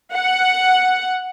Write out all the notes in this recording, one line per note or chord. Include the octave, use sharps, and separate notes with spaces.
F#5